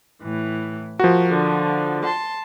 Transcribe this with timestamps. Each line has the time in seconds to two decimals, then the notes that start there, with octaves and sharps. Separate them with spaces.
0.23 A2 E3
0.99 F3 F#4 A#4
1.31 D3
2.03 A5 C6